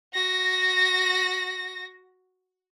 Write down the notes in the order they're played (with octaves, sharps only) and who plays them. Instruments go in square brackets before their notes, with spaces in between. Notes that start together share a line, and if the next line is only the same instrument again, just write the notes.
[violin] F#4 A#6